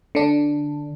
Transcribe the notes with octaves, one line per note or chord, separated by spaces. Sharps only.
D3 D4